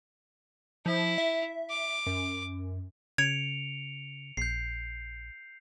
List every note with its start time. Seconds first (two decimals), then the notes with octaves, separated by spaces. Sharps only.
0.86 F3 E4
1.18 E5
1.70 D6
2.07 F#2
3.18 C#3 G#6 C#7 D7 F7
4.37 A#1 G6 C7